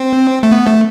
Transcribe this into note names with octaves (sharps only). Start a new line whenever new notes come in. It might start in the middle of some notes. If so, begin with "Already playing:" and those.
Already playing: C4
A3
B3
A3